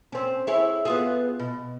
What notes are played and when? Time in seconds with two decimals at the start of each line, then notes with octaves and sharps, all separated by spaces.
0.12 C4 C#4
0.47 E4 G#4 C#5
0.85 B3 F4 G#4
1.39 B2